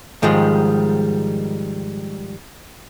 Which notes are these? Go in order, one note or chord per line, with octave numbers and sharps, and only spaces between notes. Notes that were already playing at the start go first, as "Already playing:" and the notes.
G#2 D#3 F3 G3 G#3